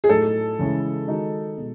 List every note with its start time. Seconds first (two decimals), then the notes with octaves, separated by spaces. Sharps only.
0.04 G#4
0.09 A2 F#3 A3 D#4 A4
0.59 C#3 E3 G#3 C#4 E4
1.08 D#3 G#3 D#4 F#4
1.58 B2 G#3